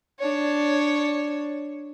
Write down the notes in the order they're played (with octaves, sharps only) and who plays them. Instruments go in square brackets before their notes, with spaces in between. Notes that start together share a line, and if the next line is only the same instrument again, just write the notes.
[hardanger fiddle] D4 C#5